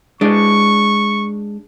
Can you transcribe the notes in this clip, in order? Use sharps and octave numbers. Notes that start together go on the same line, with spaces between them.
G#3 D4 C#6